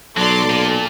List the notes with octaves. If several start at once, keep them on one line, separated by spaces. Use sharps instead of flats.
B1 F#3 A4 D5 C6 D6
A#2